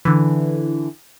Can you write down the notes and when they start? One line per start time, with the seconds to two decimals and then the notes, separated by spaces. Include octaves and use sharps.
0.05 D3 E3